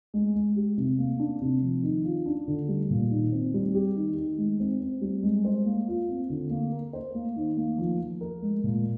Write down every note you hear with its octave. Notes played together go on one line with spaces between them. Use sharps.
G#3
G#3
G4
C3
A#3
D4
C3
F3
D#3
F4
D4
D3
G3
A#2
D#3
C4
G3
G4
D#3
D#3
G#3
C4
C4
G3
G#3
C5
A#3
F4
C4
D3
A#3
A#4
C5
A#3
D#3
A#3
F3
F3
A#4
G#3
A#2